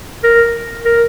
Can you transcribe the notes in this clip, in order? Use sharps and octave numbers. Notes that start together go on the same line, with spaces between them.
A#4
A#4